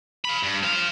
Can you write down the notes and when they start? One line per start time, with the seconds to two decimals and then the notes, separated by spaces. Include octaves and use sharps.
0.25 F5 B5
0.43 G2
0.63 C5 F5